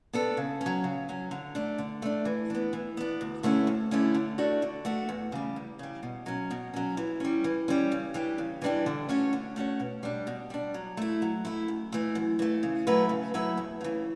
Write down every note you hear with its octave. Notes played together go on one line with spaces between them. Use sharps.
B3 D4 A4
C#3
C#4
F#3
C#3
F#3 C#4
D3
A3 D4
D3
A3 D4
E3
B3 D4
E3
B3 D4
D2
D3 A3 C#4 E4
D2
D3 A3 C#4 E4
D3
A3 D4 F#4
D3
A3 D4 F#4
E2
C#3 G3
E2
C#3 G3
B2
F#3 C#4
B2
F#3 C#4
E3
G3 C#4
E3
G3 C#4
C#3
E3 G3 D4 G4
C#3
E3 G3 D4 G4
D3
A3 C#4 F#4 C#5
D3
A3 C#4 F#4 C#5
B2
G3 D4
B2
G3 D4
F#3
A3 E4
F#3
A3 E4
F#2
E3 A3
F#2
E3 A3
C#3
F#3 A3 E4 B4
C#3
F#3 A3 E4 B4
E2
C#3 E3